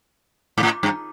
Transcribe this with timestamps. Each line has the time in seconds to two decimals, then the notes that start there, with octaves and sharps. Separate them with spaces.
0.58 G#2
0.63 A2
0.83 G2